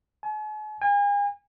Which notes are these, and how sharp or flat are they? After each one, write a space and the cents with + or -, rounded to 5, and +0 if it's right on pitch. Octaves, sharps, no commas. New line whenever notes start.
G#5 +45
G#5 -40